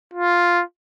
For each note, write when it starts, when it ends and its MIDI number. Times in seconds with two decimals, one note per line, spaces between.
0.14 0.63 65